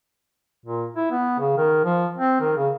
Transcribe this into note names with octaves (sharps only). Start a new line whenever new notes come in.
A#2
E4
B3
C#3
D#3
F3
C4
D#3
C#3